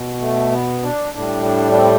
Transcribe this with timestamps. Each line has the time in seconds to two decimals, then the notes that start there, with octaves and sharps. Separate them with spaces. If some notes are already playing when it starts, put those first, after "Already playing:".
Already playing: B2
0.21 A3
0.51 B3
0.83 D4
1.14 A2 G3 D4
1.45 D4
1.72 D4
1.77 C4